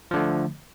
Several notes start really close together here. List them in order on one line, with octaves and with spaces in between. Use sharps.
F3 D3 A3